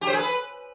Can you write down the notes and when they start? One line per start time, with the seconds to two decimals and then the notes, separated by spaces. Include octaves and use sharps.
0.01 G4
0.07 C5
0.13 G#4
0.19 B4